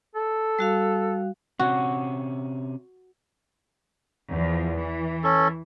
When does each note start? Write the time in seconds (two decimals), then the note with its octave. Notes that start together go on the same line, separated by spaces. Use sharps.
0.15 A4
0.59 G3 F#4 F5
1.59 C3 C#4 F#4
4.30 E2 F3
4.75 E3
5.24 C#4 A4